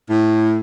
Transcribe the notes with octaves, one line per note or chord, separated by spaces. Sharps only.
A2